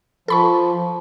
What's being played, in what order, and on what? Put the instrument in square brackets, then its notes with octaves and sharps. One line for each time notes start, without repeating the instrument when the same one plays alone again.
[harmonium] F3 [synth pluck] A4 B5 C#6